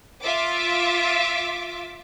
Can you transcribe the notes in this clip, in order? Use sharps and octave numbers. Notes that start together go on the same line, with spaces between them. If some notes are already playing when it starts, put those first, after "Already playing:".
F4 E5 D6